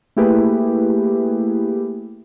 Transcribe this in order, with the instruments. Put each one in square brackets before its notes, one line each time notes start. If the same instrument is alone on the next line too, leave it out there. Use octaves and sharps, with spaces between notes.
[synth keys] A3 A#3 E4 G4 G#4 B4